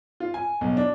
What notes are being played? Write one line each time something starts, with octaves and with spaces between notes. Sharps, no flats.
F4
G#5
B1
D4